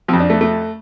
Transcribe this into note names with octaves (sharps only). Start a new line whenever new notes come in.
F2 F3 C4
D4
A3
A3